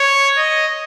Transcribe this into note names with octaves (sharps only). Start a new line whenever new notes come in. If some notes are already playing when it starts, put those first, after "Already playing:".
Already playing: C#5
D#5